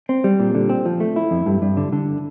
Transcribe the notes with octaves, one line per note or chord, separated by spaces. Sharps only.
C4
G3
A#2
D3
C4
F3
A3
E4
F2
G2
G2
D3
D3